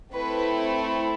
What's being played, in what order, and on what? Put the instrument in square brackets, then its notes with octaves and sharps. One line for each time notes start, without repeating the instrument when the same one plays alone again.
[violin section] A3 C4 E4 B4